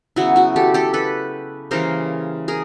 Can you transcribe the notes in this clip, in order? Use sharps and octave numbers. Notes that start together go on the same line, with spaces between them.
C#3 F#3 B3 E4 F#4
E4 F#4
G4 A4
G4 A4
A4 B4
C#3 E3 G3 A#3 A#4 C5
G#4 A#4